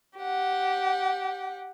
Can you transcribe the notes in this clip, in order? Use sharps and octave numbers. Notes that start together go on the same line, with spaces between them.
G4 F#5